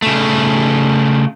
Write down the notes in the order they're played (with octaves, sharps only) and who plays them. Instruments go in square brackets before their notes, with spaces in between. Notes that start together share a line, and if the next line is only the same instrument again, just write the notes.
[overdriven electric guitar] C#3 A3